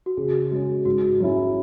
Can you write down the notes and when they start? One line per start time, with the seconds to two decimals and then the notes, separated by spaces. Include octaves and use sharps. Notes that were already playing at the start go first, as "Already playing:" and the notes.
0.06 F#4
0.17 C#3 G#4
0.51 G#3 C#4 F#4
0.85 G#2 F#4
1.20 F#3 C#4 E4